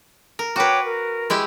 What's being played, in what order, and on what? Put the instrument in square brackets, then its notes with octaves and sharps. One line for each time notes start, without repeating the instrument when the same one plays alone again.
[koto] A#4
[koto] F#4 B4 [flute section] C#5 G5 D6
[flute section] A#4
[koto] G#3 E4 G4